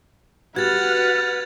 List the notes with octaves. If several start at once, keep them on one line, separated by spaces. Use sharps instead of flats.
F#4 G4 B4 F#5 F6 G#6 A6